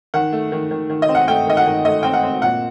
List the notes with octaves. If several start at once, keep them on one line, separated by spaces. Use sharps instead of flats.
D#3 F#5
A3
D#3
D#3
D#3
D#5
C4
F#5
A3 G5
D#3 D#5
F#5
D#3
A3 D#5
C4 G5
F#5
C4
A#2 F#5